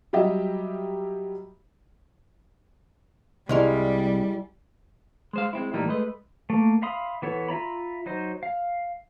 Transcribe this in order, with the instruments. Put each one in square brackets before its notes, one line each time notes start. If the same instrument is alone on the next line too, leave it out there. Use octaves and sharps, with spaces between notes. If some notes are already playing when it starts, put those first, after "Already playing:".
[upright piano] F#3 G3 G4 D#5 E5
[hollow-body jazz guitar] C2 [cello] G3 [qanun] G#3 E4 F5
[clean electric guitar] G#3 C5 F5
G#3 C4 E4
A2 E3 G3 A#3 D#4
G#3 A3 B4 D#5
[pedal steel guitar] A3 A#3
E5 F5 B5 C6 D#6
E3 B3 A4 C#5
F4 E5 A#5 B5
F#3 D#4 C5
F5